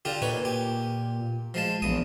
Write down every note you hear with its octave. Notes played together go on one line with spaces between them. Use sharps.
D3 F4 G4
A#2 D#4 B4 C#5
G4
F3 G#3 A5
A#1 E2 D#6